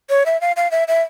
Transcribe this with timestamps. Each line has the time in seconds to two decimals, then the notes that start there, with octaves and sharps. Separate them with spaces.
0.10 C#5
0.26 E5
0.41 F5
0.56 F5
0.71 E5
0.88 E5